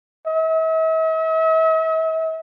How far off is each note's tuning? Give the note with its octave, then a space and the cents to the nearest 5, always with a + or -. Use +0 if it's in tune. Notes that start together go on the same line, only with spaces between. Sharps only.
E5 -45